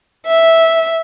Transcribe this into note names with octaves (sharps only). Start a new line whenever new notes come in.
E5